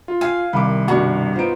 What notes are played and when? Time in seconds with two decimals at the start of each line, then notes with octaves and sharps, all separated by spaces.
0.08 F4
0.21 F5 G5 G#5 D#7
0.53 C2 D#3 B5 D6
0.88 G2 B2 F#4
1.36 B3 D#4 F4 C5 D7